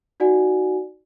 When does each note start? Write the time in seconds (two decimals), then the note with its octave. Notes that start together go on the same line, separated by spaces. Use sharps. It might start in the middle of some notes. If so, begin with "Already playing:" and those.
0.20 D#4 F#4 D5 F#5 G#5